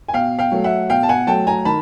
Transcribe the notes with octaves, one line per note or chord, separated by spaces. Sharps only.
G#5
B2 F5 G5
F5 G5
F#3 A3
E5 F#5
B2 F5 G5
A5
F#5 G#5
F#3 A3 G5 A5
G#5 A#5
D#3 A5 B5